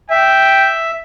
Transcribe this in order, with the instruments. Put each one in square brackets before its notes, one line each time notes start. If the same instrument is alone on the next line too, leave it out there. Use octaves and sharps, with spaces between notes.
[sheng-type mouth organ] E5 [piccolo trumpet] G5